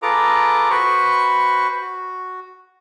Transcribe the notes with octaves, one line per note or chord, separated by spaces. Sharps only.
F4 G#4 A4 B4 A#5 D6
F#4 B4 C5 B5 C#6
F#4